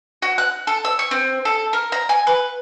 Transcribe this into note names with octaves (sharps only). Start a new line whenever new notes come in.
F#4
F#6
A4
E6
C#6
C4
A4
A#4
A#5
G#5
B4